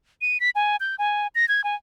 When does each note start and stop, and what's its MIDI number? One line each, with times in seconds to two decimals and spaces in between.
0.21 0.40 99
0.40 0.50 95
0.55 0.76 80
0.80 0.96 91
0.99 1.27 80
1.35 1.48 94
1.48 1.64 92
1.64 1.75 80